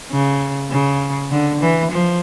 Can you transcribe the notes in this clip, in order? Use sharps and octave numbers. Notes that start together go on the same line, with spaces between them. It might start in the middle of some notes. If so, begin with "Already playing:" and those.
C#3
C#3
D3
E3
F3